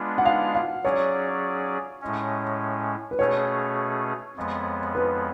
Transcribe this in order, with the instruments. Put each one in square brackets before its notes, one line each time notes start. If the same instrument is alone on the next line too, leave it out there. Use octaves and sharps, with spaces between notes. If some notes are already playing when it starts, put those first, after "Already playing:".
Already playing: [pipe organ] G#3 B3 D4 F4
[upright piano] F#5
F5
F5
[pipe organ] F#3 C#4 G#4 D5 [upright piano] C#5
[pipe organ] A2 G#3 C#4
[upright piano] B4
[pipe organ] B2 A3 C#4 G#4 [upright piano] C#5
[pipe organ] F2 F3 G#3 B3
[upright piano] B4